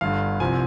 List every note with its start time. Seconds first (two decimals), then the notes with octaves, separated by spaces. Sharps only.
0.01 G1 G2 D3 F5
0.40 C2 C3 F3 C4 G#5